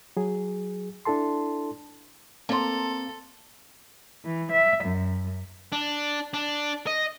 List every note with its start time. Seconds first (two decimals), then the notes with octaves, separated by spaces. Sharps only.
0.17 F#3 G#4
1.05 D4 E4 A4 A5 C6
2.49 A#3 C4 A4 A5 A#5 C6
4.24 E3
4.52 E5
4.84 F#2
5.72 D4
6.34 D4
6.87 D#5